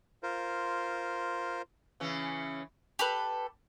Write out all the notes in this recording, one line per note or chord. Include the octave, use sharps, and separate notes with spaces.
F4 A#4 C5
C#3 E3 C#4
G4 A4 B4